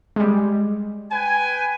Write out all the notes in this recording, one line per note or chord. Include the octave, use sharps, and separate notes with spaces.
G3 G#3
B4 G5 G#5